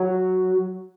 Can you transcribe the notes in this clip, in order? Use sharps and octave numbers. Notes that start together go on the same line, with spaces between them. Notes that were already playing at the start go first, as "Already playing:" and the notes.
Already playing: F#3